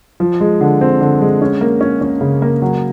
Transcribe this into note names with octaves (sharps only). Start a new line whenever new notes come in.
F3
G#3
D3
C4
D3
G#3
C#4
A#3
C#4
C#4
C#3
A#3
F#3